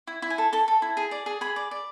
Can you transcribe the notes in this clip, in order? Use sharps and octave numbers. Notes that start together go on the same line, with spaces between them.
E4
E4
G#5
A4
A4 A5
A4
E4
G#4
D5
G#4
G#4 B5
D5
D5